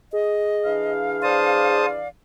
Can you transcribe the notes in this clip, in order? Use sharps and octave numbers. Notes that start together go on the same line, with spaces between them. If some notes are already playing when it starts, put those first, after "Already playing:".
G#4 D#5
E3 D4 F5
C5 D5 A5 D#6